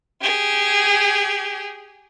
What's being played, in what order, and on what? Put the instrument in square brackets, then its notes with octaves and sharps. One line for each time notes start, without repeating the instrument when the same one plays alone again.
[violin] G4 G#4